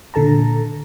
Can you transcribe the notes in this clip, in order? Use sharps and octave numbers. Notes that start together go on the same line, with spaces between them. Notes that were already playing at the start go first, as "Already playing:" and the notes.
A#2 D3 A4 A5 A#5